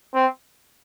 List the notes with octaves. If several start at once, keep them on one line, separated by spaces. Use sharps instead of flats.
C4